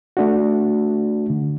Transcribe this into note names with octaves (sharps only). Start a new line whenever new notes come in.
A3 D4 F#4
D3